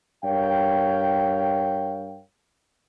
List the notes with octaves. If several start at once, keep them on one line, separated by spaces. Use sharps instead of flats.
G2 A#4 C#5 F5 G5